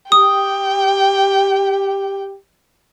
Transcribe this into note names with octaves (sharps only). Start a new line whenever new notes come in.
G4 G5 D#6